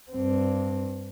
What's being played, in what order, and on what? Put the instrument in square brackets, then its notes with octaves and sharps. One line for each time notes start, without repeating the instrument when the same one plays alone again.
[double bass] G2 C4